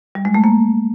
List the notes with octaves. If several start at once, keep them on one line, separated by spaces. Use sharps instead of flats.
G3
G#3
A3
A#3